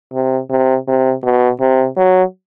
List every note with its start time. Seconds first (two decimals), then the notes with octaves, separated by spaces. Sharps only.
0.13 C3
0.50 C3
0.87 C3
1.23 B2
1.60 C3
1.97 F#3